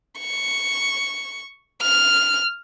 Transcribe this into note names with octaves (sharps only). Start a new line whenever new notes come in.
C#6
F6